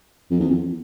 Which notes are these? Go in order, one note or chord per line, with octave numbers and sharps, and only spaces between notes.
F2
E2
F2